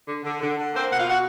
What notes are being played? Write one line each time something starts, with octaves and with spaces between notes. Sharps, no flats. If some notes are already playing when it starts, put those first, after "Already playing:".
D3
D3
D3
D3
A#3 C4 C5
B2 F#5
F4 F5
F#4 F#5